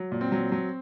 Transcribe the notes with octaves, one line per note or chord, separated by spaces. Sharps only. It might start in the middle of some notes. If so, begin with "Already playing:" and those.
Already playing: F#3
A#2
C4
F#3
F#3